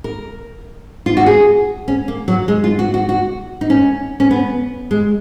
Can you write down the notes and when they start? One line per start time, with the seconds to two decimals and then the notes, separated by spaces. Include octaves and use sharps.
0.04 A#4
1.06 F4
1.17 F#4
1.26 G#4
1.88 C#4
2.08 A#3
2.28 F#3
2.48 G#3
2.64 F4
2.79 F#4
2.94 F#4
3.09 F#4
3.61 D#4
3.70 C#4
4.20 C#4
4.31 B3
4.91 G#3